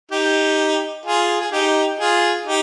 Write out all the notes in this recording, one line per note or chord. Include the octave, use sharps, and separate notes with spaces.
D#4 G4
F4 G#4
G#4
D#4 G4
F4 G#4
D#4 G4